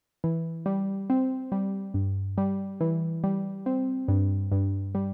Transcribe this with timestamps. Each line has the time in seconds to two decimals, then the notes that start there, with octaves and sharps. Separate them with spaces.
0.24 E3
0.66 G3
1.10 C4
1.52 G3
1.94 G2
2.38 G3
2.81 E3
3.24 G3
3.66 C4
4.08 G2
4.52 G2
4.95 G3